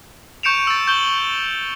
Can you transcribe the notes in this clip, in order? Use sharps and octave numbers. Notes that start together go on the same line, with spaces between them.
C#6 G6 C#7 D7 E7 F7
E6 A6
C#6 G6 E7 F#7 G7